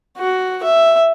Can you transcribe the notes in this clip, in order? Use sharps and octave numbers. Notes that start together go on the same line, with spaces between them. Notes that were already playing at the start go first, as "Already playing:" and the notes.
F#4
E5